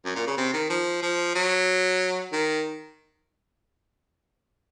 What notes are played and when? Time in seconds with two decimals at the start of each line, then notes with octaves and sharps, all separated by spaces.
0.05 F#2
0.15 A#2
0.27 C#3
0.37 C3
0.54 D#3
0.70 F3
1.02 F3
1.35 F#3
2.32 D#3